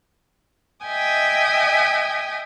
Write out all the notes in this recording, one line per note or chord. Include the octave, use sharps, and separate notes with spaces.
D#5 E5 G5 G#5 D#6